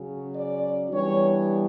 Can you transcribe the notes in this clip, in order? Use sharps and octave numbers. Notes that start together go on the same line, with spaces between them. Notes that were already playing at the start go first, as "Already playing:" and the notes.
Already playing: C#3 F#3 C#4
D5
E3 G3 B3 D4 C#5